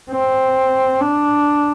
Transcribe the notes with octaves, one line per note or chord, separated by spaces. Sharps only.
C4
D4